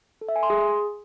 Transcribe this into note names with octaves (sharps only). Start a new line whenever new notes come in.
A4
E5
G#5
C6
G#4